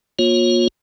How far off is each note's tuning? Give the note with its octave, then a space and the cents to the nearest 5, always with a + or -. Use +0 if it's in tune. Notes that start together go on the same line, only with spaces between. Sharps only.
A#3 +35 F4 +35 C#5 -25